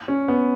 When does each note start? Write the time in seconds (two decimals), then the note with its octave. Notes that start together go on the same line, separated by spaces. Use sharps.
0.08 C#4
0.28 B3